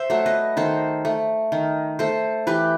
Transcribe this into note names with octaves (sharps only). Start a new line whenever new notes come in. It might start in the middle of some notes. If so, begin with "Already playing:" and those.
Already playing: C5 E5
F#3 A3
B4 D#5
D#3 A4 C5
A3
D#3
A3 A4 C5
E3 G4 B4